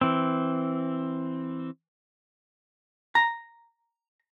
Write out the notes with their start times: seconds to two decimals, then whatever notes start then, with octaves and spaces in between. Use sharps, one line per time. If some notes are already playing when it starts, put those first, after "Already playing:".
0.01 E3 C4
3.15 A#5